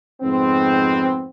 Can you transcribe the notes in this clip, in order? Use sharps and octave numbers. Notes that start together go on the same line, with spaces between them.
F2 G#2 B3 C4